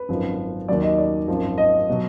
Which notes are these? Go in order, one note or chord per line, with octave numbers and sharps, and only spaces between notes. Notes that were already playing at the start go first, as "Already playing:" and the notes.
Already playing: B4
G#1 F#2 F3
D#2 D#3 F#3 D5
D#5
D5
G#1 F#2 F3
D#5
B2 F#3